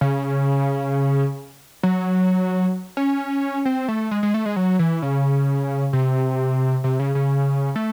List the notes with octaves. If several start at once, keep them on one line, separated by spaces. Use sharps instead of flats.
C#3
F#3
C#4
C4
A3
G#3
G#3
A3
G#3
F#3
E3
C#3
C3
C3
C#3
C#3
A3